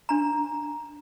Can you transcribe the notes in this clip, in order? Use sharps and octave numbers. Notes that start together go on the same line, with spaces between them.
D4 A#5